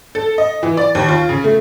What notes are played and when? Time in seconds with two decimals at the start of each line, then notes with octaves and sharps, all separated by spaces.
0.15 A4
0.38 D#5
0.63 E3
0.77 D5
0.95 D#2
1.08 F4
1.29 C#3
1.44 A3